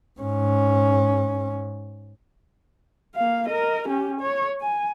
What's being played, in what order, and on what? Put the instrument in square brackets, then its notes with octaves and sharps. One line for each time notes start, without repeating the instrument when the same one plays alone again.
[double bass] G#2 C#4
[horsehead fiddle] A#3 F5
A#4 D#5
C#4 G4
C#5
G#5